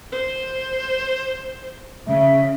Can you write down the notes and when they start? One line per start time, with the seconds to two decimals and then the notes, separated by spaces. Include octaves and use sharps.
0.12 C5
2.08 C#3 E5